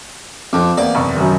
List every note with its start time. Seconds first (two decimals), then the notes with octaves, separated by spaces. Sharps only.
0.53 F2 C4 D6
0.78 E2 A#3 D5
0.95 F#1 C3 C#6
1.16 F#2 D#3